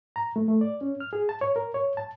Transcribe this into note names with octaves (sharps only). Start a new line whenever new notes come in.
A#5
A3
A3
D5
C#4
F6
G#4
A5
C#5
A#4
C#5
A5